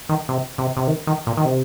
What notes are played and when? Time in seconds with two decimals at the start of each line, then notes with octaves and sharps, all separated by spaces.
0.09 D#3
0.29 C3
0.58 C3
0.77 C3
0.87 D#3
1.07 D#3
1.27 A#2
1.37 D#3
1.45 C3